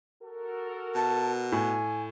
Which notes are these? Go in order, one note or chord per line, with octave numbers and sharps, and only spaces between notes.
F#4 A4 A#4
B2 A5
A2 G#5